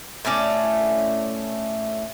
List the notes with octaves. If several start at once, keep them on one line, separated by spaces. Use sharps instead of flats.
A2 A3 C#4 D5